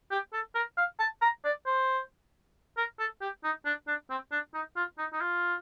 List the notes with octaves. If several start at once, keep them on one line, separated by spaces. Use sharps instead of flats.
G4
A4
A#4
F5
A5
A#5
D5
C5
A#4
A4
G4
D#4
D4
D4
C4
D4
D#4
F4
D#4
D#4
F4